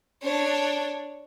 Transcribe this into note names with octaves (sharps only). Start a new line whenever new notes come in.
D4 C#5